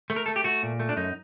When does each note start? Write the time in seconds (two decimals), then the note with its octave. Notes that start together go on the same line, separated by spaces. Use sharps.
0.10 A3
0.16 A#4
0.26 A3 A4
0.36 G4
0.44 A3 F#4
0.63 A#2
0.80 A3
0.89 D4
0.97 F#2 D#4